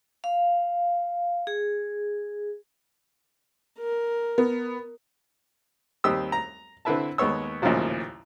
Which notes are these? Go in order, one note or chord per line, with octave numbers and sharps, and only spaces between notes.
F5
G#4
A#4
B3
D#2 G3 C4 G4 D#6 E6
A#5
D3 C4 E4 B4 E5 A5
D#2 G#3 B3 C#5 E6
A1 D#2 A#2 C#3 F3 F#3